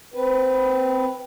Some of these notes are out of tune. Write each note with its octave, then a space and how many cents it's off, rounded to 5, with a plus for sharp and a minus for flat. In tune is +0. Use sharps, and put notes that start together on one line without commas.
C4 -15 B4 +0